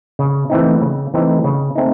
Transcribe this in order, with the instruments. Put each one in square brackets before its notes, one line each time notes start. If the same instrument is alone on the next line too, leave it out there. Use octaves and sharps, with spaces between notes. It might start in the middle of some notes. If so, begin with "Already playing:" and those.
[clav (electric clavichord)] C#3
E3 A3 C4 D#4
C#3
E3 A3 C4 D#4
C#3
A3 C4 D#4